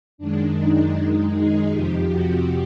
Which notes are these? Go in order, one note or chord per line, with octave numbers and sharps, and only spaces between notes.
F#2 D#3 G#3 D4
D#4
F#2 D#3 G#3
G#4
F2 C3 F3 G4
F#4